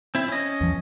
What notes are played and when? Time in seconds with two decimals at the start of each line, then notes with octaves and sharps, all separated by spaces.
0.15 C4 E4
0.28 C#4 D#5
0.61 E2 F3